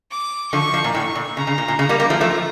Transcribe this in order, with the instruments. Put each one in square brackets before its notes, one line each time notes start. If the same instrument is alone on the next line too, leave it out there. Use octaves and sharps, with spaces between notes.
[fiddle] D6
[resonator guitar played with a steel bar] D3 F3 [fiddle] C#6
[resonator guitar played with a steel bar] D3 F3
A#2
[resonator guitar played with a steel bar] A2 [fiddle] C#6
[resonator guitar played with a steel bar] A#2
[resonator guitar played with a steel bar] C#3 [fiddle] A#5
[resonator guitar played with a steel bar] C#3
A#2
A#2
[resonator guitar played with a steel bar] C#3 [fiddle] A#5
[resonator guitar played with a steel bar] G3 A#3
G3 A#3
F3 A3
F3 A3